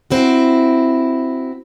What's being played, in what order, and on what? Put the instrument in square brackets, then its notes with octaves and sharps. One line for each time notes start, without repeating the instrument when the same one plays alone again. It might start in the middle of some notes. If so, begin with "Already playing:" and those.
[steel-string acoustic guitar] C4 E4 F#4